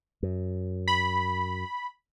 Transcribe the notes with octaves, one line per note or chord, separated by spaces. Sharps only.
F#2
B5